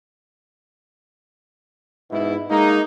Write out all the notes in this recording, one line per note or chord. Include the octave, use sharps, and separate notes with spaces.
G#2 B2 E4
G#3 A#3 D#4